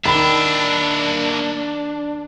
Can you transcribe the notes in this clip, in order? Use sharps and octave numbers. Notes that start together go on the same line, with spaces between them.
D#3 A#3 D4 E5 B5